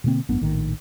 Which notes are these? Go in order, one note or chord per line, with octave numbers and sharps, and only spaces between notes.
B2 D3 A#3 C4
G#1 F#2 B3 D4
A#1 A2 D#3